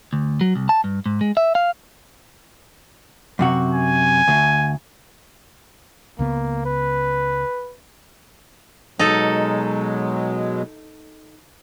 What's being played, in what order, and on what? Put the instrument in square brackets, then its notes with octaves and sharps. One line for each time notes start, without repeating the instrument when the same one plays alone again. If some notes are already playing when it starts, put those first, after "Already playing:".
[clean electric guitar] D2
F#3
C2
A5
G2
G#2
G#3
E5
F5
[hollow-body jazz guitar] F#2 C3 F#4
[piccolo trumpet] G#5
[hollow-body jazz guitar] D2
[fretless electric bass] C#2 C#3 B3 [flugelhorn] A#3
[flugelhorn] B4
[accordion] B2 F#3 G#3 [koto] D#4 A4